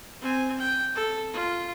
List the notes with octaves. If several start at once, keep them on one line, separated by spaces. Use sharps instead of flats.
C4 G#5
G5
A4
F4